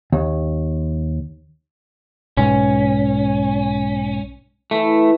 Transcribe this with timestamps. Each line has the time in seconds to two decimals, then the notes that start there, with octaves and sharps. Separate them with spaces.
0.12 D#2
2.37 B1 G#2 C#4
4.71 E3 A3